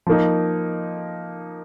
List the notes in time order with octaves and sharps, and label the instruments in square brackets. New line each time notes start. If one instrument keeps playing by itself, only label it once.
[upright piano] F3 A#3 D#4